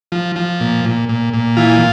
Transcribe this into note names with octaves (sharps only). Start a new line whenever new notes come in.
F3
F3
A#2
A#2
A#2
A#2
E3 F4